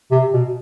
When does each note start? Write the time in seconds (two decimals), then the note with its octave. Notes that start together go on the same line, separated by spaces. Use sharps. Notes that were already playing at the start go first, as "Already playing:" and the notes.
0.11 C3
0.34 B2